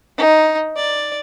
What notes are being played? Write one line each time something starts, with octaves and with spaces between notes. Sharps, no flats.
D#4
D5